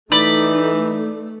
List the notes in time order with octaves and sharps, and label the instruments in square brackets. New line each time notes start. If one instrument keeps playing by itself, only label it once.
[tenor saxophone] E3 [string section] A3 [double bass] D#4 [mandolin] D5 B5